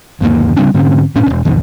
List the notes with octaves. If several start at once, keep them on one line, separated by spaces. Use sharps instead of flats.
G1 D#2 A#3
C#3 G3 C4 D4
G#2 D3 C4 C#4
A2 C#4 D4
E1 A#1
B1 F2 D#3